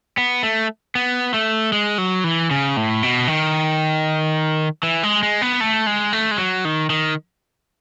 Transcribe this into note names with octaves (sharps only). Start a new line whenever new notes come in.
B3
A3
B3
A3
G#3
F#3
E3
C#3
A2
B2
D#3
E3
G#3
G#3
B3
A3
G#3
A3
G#3
F#3
D#3
D#3